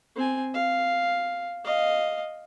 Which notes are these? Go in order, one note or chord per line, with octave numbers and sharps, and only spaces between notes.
C4 G#5
F5
D#5 F5